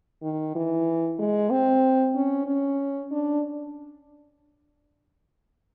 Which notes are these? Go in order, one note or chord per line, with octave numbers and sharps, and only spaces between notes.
D#3
E3
G#3
C4
C#4
C#4
D4